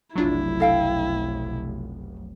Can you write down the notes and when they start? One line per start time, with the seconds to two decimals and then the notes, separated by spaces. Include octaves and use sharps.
0.16 F1 B1 F#3 D4 E4 F4
0.60 A4 F5 G5